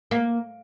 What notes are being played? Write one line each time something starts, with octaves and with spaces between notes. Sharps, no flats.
A#3